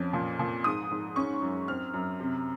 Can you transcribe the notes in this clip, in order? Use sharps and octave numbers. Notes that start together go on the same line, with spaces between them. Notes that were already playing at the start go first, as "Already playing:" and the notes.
Already playing: F2 C#4
A#2
A#2
G#2 D#6
G#2
C#4 C#6
F#2
C4 F6
F#2
C3